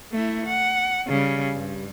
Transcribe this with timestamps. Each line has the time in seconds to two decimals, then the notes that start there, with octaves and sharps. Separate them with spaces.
0.12 A3 E4
0.47 F#5
1.07 C#3 G3
1.54 G2